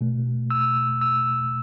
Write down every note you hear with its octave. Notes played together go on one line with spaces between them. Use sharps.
B2 A3
E6
E6